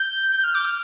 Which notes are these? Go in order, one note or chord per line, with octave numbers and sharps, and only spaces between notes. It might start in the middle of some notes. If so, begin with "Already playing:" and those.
Already playing: G6
G6
F6
D6
F6